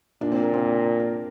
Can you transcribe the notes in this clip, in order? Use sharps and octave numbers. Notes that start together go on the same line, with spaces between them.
A#2 D4
C4
A#3
C4
A#4